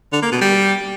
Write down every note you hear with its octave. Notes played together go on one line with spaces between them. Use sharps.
D3
A#3
B2
G3